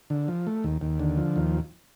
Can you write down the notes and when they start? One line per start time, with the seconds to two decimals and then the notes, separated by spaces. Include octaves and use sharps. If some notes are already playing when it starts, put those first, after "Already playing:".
0.10 D3
0.28 F3
0.47 A3
0.64 D#2
0.81 D#2
1.00 D3
1.17 F3
1.36 D#2